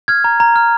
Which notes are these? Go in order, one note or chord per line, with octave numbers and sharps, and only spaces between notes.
F6 G#6
A#5
A#5
F6